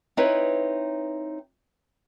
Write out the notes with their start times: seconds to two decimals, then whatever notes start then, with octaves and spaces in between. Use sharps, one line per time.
0.17 C4 D#4 E4 B4 C#5